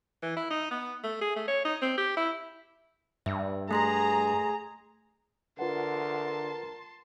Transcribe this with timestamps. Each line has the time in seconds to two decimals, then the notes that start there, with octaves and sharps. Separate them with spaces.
0.22 E3
0.37 E4
0.50 D#4
0.71 B3
1.03 A3
1.21 G#4
1.36 A3
1.48 C#5
1.65 D#4
1.82 C4
1.97 G4
2.17 E4
3.26 G2 E5
3.71 A3 G#4 A#5 C6 A#6
5.59 D3 F4 A#4 B4 F#5 A5 C6